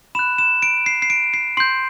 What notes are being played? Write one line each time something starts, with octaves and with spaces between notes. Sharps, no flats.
B5 F#6 E7
E7
D7
C7
C7
D7
C7
C6 G6 C7